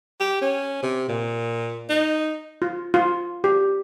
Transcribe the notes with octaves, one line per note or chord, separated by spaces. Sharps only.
G4
C#4
C3
A#2
D#4
F4
F4
G4